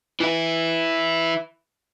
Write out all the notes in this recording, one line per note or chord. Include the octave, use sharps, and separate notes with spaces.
E3 E4